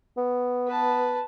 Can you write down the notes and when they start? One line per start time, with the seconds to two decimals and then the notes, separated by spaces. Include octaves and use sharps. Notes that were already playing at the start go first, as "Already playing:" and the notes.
0.17 B3
0.68 B4 A5